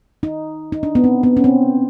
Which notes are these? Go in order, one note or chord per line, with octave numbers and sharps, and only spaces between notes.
D#4
D#4
D4
B3
C4
B3
C#4
C4